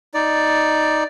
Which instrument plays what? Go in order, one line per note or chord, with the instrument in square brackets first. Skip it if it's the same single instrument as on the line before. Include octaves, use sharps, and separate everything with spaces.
[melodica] D#4 D5